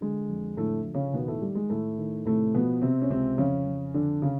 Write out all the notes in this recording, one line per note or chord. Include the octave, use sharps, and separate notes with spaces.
D3 G#3
F2
A2 D3 A3
F3
C#3 C#4
B2 D#3 B3
A2 A3
D#3 G3
G#3
A2 D#3 A3
D#3
A2 C3 A3
B2 F3 B3
C3 C4
C#4
C#2 C3 C4
F2 C#3 C#4
F2
F2 D3 D4
C#3 C#4